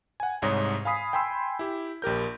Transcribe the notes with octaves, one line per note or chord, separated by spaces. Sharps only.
F#5 G#5
C2 G#2 C#5 D#6 A#6
F5 G#5 B5 D#6 B6 C7
G5 G#5 B5 C6 E6
E4 G4
A#1 G4 A#4 G6